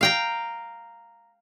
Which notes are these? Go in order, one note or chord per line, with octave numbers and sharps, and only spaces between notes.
F5 G5 A#5